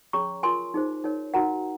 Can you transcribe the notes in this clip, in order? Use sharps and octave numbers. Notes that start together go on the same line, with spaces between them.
C#4 G#4 C#5 A#5 C#6
F4 A#4 C#5 G#5 C6
D#4 G#4 C5
D#4 A#4 C#5
D#4 F#4 A#4 F#5 A#5